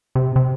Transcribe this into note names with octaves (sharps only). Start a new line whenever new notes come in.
C3
C3